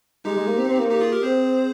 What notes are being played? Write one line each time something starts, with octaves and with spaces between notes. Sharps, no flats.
G#3 D#4 G4
G#3
A#3
C4
C4
A#3
D#4 G4
F4 G#4
G4 A#4
C4 G#4 C5